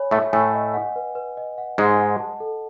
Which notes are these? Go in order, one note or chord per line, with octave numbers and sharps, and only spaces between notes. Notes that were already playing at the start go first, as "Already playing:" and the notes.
Already playing: C#5 G#5 B5
A2 A3 E5
A2 A3 G#5
D#5
F#5
B4
B4
D#5
F#5
G#2 G#3 D#5
F#5
A5
A4